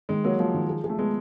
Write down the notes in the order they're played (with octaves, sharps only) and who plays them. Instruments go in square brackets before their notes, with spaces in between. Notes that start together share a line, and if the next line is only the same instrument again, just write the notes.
[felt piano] D#3 [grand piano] G#3
[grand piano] F#3 [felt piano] A#3
[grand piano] F3 [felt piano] A#3
[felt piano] D#3
G#4
G#4
[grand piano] A3
[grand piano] G#3 [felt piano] B3